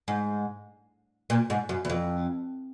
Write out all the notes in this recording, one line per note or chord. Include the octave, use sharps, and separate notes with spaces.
G#2
A#2
G#2
F#2
E2
F2